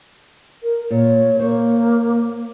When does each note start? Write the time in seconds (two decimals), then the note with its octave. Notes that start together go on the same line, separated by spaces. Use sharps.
0.63 A#4
0.90 A#2 C#5
1.39 A#3 C5 C#5